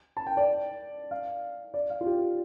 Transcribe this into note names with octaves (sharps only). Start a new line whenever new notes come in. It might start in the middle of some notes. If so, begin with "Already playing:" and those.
A5
G5
D5
F5
D5
F5
F4
G4